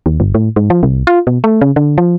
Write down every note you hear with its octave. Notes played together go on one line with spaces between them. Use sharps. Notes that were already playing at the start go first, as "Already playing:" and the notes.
D#2
G1
A2
G#2
F3
C2
F4
B2
A3
C#3
D3
F3